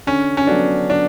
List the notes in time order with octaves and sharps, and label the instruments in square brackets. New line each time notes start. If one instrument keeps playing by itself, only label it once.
[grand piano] D3 [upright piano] C#4
[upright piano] C#4
[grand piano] F#3 B3 F#4 A4 [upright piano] D4
[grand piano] D3 [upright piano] D4